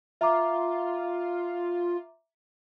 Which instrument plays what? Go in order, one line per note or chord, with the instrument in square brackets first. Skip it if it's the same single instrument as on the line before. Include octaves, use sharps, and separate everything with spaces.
[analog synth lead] F4 [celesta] E5 A#5 D6